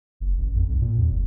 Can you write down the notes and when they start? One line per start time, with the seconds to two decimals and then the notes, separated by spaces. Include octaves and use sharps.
0.20 F#1
0.38 A1
0.55 F2
0.69 B1
0.81 A#2
0.97 E2
1.10 F1